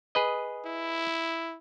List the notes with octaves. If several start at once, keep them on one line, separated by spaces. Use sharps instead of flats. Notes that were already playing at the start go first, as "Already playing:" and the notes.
G#4 B4 D#5
E4